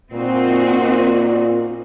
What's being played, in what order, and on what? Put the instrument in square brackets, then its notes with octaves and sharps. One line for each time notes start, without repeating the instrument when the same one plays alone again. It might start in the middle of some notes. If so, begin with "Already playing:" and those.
[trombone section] A#2 [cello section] C4 D#4 F#4